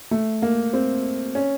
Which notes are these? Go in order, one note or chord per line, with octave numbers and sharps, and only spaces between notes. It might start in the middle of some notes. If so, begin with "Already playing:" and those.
A3
A#3
C4
C#4